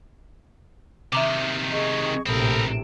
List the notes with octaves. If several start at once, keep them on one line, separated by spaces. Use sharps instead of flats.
C3 D#3 E5 A#5 D6
G#4 D#5 C#6
A#1 A2 C3 C4 A4 A#4 B5 D#6